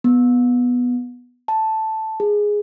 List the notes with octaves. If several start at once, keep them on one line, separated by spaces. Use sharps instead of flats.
B3
A5
G#4